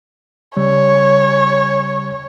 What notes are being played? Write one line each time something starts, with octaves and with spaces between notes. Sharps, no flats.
C#3 G3 C#5